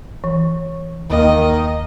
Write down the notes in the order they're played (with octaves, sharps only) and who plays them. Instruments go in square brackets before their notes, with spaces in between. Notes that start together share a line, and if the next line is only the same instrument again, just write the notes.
[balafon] E3
[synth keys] D#2 A#3 [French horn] D#3 [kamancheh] D#5